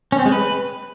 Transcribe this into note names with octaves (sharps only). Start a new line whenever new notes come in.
C#4
C4
G#3
B4